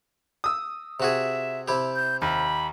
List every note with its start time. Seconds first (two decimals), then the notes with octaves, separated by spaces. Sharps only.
0.44 D#6 E6
1.00 C3 F#4 G#4 E5
1.68 C3 E4 G4
1.96 G6
2.22 D#2 B5